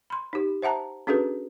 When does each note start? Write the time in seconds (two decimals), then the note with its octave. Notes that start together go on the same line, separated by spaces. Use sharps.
0.10 B5 C6
0.33 D#4 G4
0.62 C5 E5 F#5 A5 A#5
1.07 C#4 D4 F#4 G#4 A4 B4